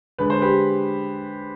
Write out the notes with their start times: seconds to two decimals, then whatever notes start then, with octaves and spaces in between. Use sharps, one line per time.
0.18 D3 G#3 B4
0.30 C5
0.42 G4 B4